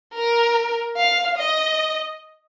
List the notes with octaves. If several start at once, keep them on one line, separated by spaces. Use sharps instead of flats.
A#4
F5
D#5